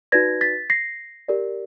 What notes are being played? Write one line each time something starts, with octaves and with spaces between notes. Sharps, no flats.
D#4 F#4 B4 D5 G#6 A#6
A6 B6
A#6 C7
G4 A#4 D5